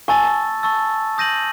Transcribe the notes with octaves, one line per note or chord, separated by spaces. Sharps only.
G#5 A5 C#6 E6 A6
A5 C#6 E6 A6
D#6 G6 A#6 D#7 F#7